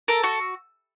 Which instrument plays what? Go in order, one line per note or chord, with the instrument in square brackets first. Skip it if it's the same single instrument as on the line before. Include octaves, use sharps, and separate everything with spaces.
[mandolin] A4 A#4
F#4